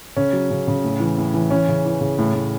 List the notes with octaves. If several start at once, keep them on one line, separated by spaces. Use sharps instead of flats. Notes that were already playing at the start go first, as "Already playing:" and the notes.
C#3 C#4
F#3
C#3
C#3
A2
E3
A2
E3
E3 C#4
C#3
E3
C#3
A2
A2